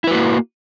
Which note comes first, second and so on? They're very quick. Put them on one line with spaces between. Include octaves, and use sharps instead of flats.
E4 B4 F#4 A#3